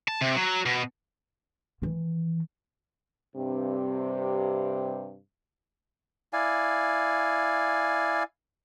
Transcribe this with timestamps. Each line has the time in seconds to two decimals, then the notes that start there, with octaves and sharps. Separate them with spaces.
0.08 A5
0.21 C3
0.36 F#3
0.66 B2
1.82 D#3 E3
3.36 G2 C3
6.33 E4 D5 F5 G#5